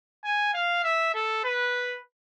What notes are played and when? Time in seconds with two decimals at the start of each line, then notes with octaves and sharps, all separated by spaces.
0.25 G#5
0.54 F5
0.84 E5
1.14 A4
1.44 B4